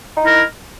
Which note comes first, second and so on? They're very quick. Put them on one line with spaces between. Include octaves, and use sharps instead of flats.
D#4 E4 A#4